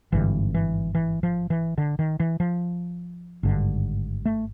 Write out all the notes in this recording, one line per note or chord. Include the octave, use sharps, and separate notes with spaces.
G#1 G2 D3 E3
E3
E3
F3
E3
D3
D#3
E3
F3
G#1 G2 D3
A3